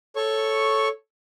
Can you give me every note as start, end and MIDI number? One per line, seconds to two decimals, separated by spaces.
0.16 0.88 69
0.16 0.88 73
0.16 0.88 85